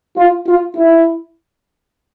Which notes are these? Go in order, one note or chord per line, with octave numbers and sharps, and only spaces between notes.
F4
F4
E4